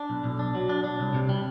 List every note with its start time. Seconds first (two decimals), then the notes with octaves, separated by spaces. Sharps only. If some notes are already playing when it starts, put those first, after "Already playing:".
Already playing: D4
0.10 B1
0.24 B1
0.39 D4
0.55 F#3
0.69 D4
0.84 D4
1.00 C2
1.14 C3
1.29 G3